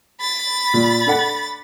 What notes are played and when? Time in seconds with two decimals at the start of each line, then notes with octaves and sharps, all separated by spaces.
0.20 B5 A6
0.74 A#2
1.06 D4 A4 F#5